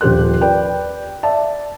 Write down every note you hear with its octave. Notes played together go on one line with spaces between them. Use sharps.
D#1 F3 G4 C5 F#6
B4 D5 G5
D5 E5 A5